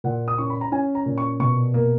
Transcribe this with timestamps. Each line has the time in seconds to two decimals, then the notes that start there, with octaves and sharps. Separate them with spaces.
0.04 A#2 F#5
0.28 D#6
0.38 C#4 C#6
0.50 B5
0.61 A#5
0.72 C#4 G#5
0.95 A#5
1.06 A#2
1.18 C#6
1.40 B2 C#6
1.74 A#3